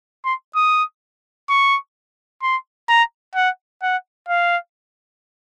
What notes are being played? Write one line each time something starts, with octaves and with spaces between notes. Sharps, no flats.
C6
D#6
C#6
C6
A#5
F#5
F#5
F5